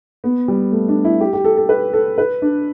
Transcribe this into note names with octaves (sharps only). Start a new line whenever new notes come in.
B3
G3
A3
D4
E4
G4
G4
A4
A4
B4
A4
B4
D4